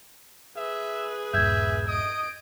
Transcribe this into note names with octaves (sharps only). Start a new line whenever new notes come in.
G#4 B4 E5
D#1 G2 E5 G6 G#6
D#5 D#6 D7